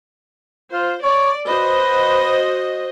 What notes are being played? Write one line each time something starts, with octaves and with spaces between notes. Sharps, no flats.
F4 C5
C#5 D5
F#4 B4 C5 D#5